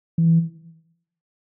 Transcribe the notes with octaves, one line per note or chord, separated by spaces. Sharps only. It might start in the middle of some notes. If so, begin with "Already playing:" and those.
E3